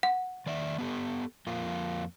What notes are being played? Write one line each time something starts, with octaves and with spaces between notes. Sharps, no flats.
F#5
D#3 D5 E5
B3 G4 A4
F2 A#3 F4